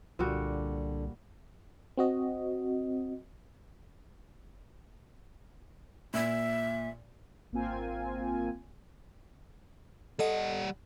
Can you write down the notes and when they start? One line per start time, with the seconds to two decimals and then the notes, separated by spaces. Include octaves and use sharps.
0.19 C2 A#2 D3 G3 F#4
1.97 C4 F#4 D#5
6.14 A#2 E5
7.52 G#1 A#3 C4 F4 G#5
10.19 G3 A4 D#5 F#5